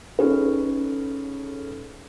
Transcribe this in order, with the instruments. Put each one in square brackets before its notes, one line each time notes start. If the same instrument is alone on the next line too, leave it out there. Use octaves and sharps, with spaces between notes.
[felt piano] C#4 D#4 G#4 A4 B4